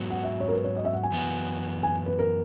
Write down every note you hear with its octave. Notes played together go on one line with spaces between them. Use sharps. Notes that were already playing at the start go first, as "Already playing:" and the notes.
Already playing: G#2 F#3 B3 F#4
F#5
E5
C#5
A#4
B4
C#5
D#5
E5
F#5
G#5
F#2 E3 B3 F#4
G#5
B4
A#4